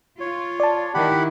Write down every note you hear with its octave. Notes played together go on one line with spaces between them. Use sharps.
F4 C#5
D5 A5
D#3 E4 G4 F#5 B5